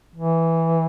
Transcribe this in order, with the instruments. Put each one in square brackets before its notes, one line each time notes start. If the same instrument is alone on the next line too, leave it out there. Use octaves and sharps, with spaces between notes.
[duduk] E3